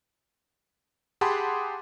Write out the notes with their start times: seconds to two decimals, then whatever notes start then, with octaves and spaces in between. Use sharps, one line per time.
1.21 G4 G#4 F#5 A5 B5 C6